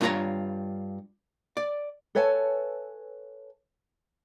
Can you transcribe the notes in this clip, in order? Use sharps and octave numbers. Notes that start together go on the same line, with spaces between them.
G2 C#4 F4 G#4 C#5 A#5
D5
A4 B4 C#5 E5 G#5 A5